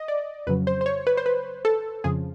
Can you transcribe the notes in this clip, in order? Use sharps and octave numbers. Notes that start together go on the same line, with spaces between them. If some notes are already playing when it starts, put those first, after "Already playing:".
Already playing: D#5
D5
F2 C#3 F#3 B4
C5
C5
C#5
B4
C5
B4
A4
F2 C#3 F3 G#4